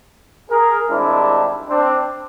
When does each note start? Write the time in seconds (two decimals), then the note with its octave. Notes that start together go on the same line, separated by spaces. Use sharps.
0.51 G#4 A#4
0.90 C2 C3 D#3 G#3 C4 D4 E4
1.69 C4 D4